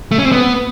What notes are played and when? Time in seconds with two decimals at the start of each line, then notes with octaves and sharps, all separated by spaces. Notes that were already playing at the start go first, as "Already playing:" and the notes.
0.11 A3
0.18 C#4
0.25 C4
0.32 B3